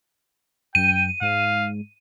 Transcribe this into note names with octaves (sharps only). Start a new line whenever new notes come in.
F#2 G5 D#7
G#2 F5